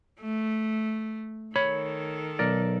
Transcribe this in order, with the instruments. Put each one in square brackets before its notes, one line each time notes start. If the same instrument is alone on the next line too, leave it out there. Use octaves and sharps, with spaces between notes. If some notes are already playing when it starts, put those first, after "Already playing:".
[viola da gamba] A3
[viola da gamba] D#3 A4 [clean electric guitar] C#5 B5
[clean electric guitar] B1 A#4 D5